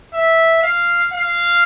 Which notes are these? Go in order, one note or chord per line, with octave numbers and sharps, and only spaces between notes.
E5
F5
F5